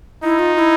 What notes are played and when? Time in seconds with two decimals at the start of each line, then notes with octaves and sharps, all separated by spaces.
0.23 D#4 E4
0.39 F4
0.54 F4
0.59 E4